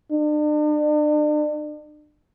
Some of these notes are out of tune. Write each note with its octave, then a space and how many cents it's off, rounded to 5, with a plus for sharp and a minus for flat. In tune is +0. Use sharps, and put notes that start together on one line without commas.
D4 +40